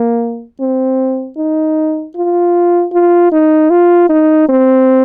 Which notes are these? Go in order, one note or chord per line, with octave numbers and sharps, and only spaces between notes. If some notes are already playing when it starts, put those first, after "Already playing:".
Already playing: A#3
C4
D#4
F4
F4
D#4
F4
D#4
C4